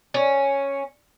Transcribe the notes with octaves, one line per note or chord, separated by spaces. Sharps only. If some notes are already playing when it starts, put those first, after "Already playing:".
C#4